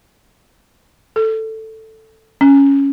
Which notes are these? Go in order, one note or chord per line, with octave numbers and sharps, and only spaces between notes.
A4
C#4